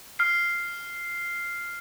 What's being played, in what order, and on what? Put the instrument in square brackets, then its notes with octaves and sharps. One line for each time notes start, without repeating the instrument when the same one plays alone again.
[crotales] F6 C7